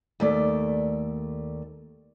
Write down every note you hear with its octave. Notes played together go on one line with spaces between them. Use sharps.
D#2 A3 D5